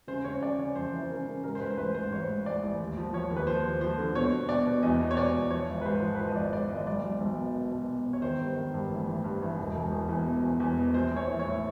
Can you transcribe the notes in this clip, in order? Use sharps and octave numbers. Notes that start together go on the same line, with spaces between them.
C#3 C5
C#3 C#5
C#3 D5
C#3 C#5
F2 C5
E3
C#3 A#4
C#3
G#2 A#4
C5
G#2 B4
C5
A1 B4
G#2 C5
A1 C#5
G#2
A1 D5
A1
D#2
F3
F3 C#5
D#2
B4
F3 C5
D#2
F3 C5
D3
B2 C#5
B2
B2 D5
B2
E2 D#5
B2
C#5
B2 D5
E2
F3 C#5
G#1
B4
G#2 C5
F3
B4
F3 C5
D#5
G#1 D5
G#2 D5
G#1 D#5
B1 D5
B1
B1
B2
B2
B2
B2
B2
C#5
D#3 C5
G2
D#3
G2
A1
A1
G2
A1
E1
E1
E2
E2
B2
E2
E2
B2
A#1 C5
A#1
C#5
E3
C#5
A2